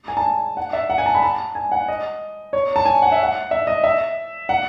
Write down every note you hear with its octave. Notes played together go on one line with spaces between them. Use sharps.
G#5
A5
F#5
E5
F#5
G#5
A5
B5
A5
G#5
F#5
D#5
C#5
A5
G#5
F#5
E5
F#5
E5
D#5
E5
F#5